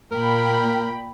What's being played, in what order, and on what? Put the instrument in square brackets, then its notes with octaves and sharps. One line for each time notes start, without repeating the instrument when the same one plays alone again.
[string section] A#2 G5 B5 [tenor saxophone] A#4